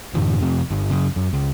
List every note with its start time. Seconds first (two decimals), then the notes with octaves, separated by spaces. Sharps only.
0.15 F#2 A2 D3 E3
0.41 F2 C3
0.70 G1
0.90 F#2 C#3
1.16 F#2
1.33 C#2